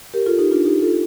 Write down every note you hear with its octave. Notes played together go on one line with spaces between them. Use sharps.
G4 A#4
F4 A4
D#4 G4
D4 F4
D#4 G4
F4 A4